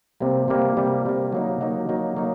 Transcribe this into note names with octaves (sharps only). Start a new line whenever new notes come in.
C3 G3 A#3
C3 G3 A#3
C3 G3 A#3
C3 G3 A#3
F#3 A#3 D#4
F#3 A#3 D#4
F#3 A#3 D#4
F#3 A#3 D#4